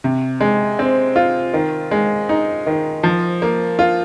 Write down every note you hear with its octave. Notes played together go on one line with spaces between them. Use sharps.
C3
G#3
C4
F4
D#3
G#3
D#4
D#3
F3
A#3
F4